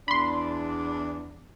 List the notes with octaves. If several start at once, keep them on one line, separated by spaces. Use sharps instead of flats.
E2 D4 B5 C6